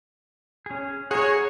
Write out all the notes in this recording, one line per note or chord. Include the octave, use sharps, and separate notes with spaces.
C#4 G#4
G#4 C#5 F#5 A#5 C#6